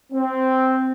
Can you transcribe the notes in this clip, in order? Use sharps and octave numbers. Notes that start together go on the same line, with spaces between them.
C4